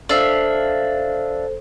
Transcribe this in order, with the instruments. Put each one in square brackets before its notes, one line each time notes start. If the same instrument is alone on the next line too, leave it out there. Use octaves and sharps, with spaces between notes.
[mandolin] D4 E5 F5 [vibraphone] A4 C5